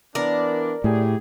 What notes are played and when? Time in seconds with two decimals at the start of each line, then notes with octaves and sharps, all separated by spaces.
0.15 E3 B3 D4 A#4 D5
0.84 A2 G4 G#4